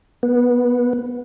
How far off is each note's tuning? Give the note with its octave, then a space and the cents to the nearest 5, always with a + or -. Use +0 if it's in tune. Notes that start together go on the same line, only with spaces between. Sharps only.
B3 -15